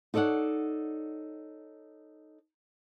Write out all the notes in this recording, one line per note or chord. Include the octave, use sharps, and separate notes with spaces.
D#4 A4 C#5 D5 F#5